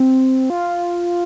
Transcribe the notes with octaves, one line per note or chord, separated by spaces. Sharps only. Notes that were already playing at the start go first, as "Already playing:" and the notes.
Already playing: C4
F4